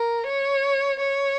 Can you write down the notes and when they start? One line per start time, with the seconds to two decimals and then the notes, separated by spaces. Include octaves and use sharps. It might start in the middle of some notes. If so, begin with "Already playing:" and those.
Already playing: A#4
0.27 C#5
1.01 C#5